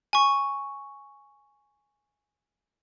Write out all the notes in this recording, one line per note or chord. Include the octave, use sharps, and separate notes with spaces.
G#5 C#6